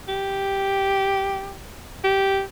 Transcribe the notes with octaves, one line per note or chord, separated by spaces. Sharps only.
G4
G4